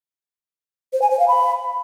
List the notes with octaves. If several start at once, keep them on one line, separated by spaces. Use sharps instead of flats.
C5
G#5
C5
F5
B5